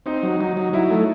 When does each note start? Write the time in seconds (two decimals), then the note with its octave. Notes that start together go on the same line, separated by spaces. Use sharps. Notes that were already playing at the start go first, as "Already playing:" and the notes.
0.06 C4 D#4
0.23 F#3
0.40 F#3 D#4
0.57 F#3
0.73 F#3 E4
0.90 A3